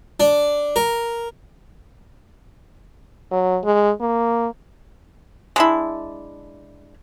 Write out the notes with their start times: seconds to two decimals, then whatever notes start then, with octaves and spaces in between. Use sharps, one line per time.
0.20 D4
0.76 A#4
3.31 F#3
3.64 G#3
4.01 A#3
5.56 G#3 D4 E4